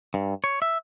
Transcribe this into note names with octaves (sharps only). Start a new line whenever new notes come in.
G2
C#5
E5